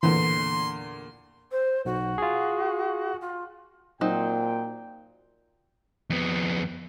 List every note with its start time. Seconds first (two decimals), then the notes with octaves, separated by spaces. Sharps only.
0.03 E2 A#2 D3 E3 C6
1.51 C5
1.85 B1 F#4
2.18 F4 G#4
3.21 F4
4.01 A#2 F#3 C4 D#4 G5
6.10 F2 B3